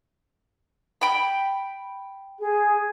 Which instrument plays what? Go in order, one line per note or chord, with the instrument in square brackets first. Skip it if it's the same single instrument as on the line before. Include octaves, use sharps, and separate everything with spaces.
[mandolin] G5 B5
[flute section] G#4